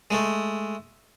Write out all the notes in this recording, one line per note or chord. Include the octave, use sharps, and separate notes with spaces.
G#3 A3